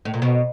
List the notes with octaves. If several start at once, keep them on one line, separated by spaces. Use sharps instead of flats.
A2
A#2
B2